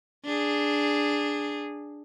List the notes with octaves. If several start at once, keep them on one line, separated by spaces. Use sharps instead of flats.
D4 G#4